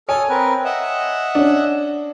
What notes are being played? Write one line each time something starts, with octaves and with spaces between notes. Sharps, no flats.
A4 C#5 G#5 D#6 F6
C4 A#4 B4
D#5 E5 F#5
C#4 D4